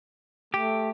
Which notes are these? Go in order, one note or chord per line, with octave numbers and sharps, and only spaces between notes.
A3 G4